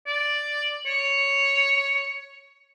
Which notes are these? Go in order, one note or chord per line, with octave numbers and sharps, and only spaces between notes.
D5
C#5